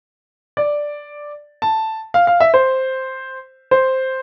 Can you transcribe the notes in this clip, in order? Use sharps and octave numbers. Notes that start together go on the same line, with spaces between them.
D5
A5
F5
F5
E5
C5
C5